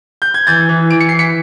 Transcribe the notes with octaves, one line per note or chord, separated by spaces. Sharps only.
G6
G#6
E3 G6 A6
E3
E3 D7
C#7
C7
E3
B6 C#7